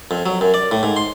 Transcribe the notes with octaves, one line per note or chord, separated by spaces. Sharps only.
F2
F#3
F#2
D5
A2
G#2
C6